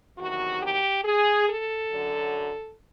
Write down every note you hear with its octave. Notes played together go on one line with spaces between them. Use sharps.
E2 C3 D#3 F#3 F#4
G4
G#4
A4
F#2 D3 F#3